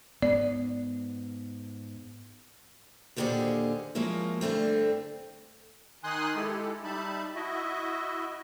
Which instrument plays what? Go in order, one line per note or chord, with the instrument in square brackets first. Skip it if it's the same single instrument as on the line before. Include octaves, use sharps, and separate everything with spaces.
[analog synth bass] G#2 [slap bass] B3 [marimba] D5
[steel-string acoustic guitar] D#2 A#2 D3 G4 G#4 C5
F3 F#3 G#3 A#3 E4
G2 D3 A3 C4
[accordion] D#3 D#4 G#5 C6 D#6 F#6
G#3 E4 G4 A4
G3 D#4 E5 A5 B5
E4 F#4 D#5 E5